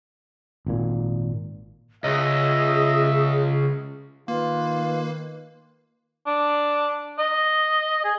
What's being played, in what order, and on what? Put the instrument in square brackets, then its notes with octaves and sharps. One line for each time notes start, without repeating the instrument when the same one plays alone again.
[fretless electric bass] G#1 A#2
[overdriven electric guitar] C#2 [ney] G#4 [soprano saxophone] D#5 [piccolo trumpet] E5
[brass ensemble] D#3 [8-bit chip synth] A#3 [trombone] F4 [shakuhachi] B4
[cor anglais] D4
D#5
G#4